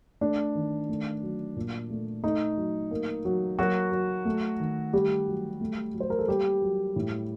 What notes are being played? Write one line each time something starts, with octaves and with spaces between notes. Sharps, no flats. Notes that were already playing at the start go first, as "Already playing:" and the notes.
A3 D4
D#3
A3
F#3
A#2
A3
A3 D#4
F#3
A#3
F#3
F#3 A#3 F#4
F#3
A3
D#3
G3 A3 G4
F#3
A3
F#3
C5
A#4
A4
G3 A#3 G4
F#3
A2